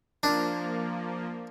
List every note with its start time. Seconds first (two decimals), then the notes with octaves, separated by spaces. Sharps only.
0.23 F3 A#3 D4